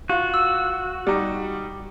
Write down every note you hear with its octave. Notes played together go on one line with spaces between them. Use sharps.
F4 F#4
E6
G3 D#4 G4